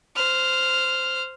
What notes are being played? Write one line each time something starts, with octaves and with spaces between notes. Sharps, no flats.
C5 F6